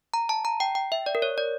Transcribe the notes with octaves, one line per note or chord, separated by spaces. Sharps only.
A#5
A5
A#5
G5
G5
E5
D5
A#4
C#5
D5